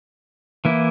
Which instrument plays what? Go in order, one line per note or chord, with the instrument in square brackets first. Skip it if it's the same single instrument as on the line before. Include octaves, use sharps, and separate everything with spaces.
[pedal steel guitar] E3 A#3 E4